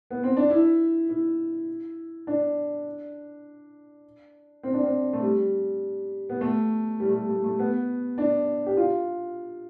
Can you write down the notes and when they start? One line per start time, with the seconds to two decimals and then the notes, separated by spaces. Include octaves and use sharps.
0.10 B3
0.23 C4
0.37 D4
0.50 E4
1.09 E4
2.27 D4
4.63 C4
4.74 D4
4.84 C4
5.13 A3
5.23 G3
6.29 B3
6.41 A3
7.00 G3
7.09 A3
7.14 G3
7.29 A3
7.44 A3
7.59 B3
8.18 D4
8.66 G4
8.77 F4